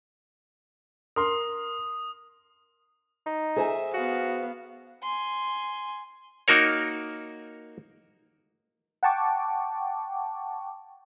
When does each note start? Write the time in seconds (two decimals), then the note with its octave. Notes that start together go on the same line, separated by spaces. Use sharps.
1.16 A#4 C6 D#6
3.26 D#4
3.56 G#4 C5 E5 G#5
3.94 B3 F#4 F5
5.03 G#5 C6
6.48 A#3 D#4 F#4 A#4 C#5
9.03 F#5 G5 A5 C#6 D6